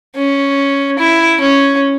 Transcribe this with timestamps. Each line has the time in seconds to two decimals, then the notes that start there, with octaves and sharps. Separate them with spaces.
0.15 C#4
0.99 E4
1.40 C#4